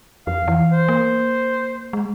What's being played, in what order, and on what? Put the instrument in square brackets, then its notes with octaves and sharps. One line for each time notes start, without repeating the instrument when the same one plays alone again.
[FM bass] F2 [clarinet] F5
[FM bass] E3
[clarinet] C5
[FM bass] A#3
G#3